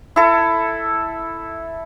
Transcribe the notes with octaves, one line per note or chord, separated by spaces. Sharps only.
E4 A4